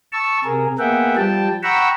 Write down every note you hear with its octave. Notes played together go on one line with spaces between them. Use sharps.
A5 C#6 E6
C3 G#4 A#4
A#3 B3 G#4 E5 F#5 G5
F3 G3 G5 A5
F#5 G5 A#5 B5 C#6 E6